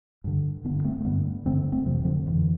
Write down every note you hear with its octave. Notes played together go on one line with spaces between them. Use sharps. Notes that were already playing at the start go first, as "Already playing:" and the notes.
G2 D3
G2 D3 B3 D4
A3 C4
A3
G2 D3 G3 B3
G2 D3 A3 C4
A3 C4
F2 C3 F3
E3
D3 F3
F2 D3 E3